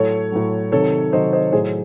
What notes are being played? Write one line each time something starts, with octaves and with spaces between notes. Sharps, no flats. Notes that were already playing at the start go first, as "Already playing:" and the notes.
Already playing: A2 F#3 A4 C#5
A2 F#3
C3 D#3 F#3 A4 C#5
C3 D#3 F#3 C5 D#5
C5 D#5
A2 F#3 G#4 C5